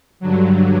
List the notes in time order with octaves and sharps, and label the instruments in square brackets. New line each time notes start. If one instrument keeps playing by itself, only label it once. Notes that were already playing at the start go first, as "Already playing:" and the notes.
[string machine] G2 D3 F#3